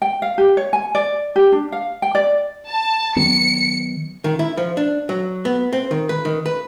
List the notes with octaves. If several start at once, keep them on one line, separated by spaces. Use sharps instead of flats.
G5
F5
G4
C#5
G#5
D5
G4
D4
F5
G5
D5
A5
D#3 F#3 B3 C#7
D#3
E4
F3
D4
F#3
B3
C4
D#3
B4
D#3
B4